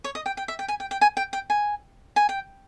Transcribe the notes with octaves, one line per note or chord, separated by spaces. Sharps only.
C#5
D#5
G5
G5
E5
G5
G#5
G5
G5
G#5
G5
G5
G#5
G#5
G5